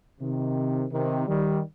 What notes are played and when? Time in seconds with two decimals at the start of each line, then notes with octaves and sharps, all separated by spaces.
0.20 C3 D#3
0.91 C3 D#3
1.27 D#3 G3